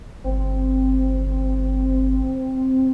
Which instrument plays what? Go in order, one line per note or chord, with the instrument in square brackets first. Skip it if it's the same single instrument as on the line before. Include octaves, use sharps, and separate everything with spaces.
[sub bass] G1 [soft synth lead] C4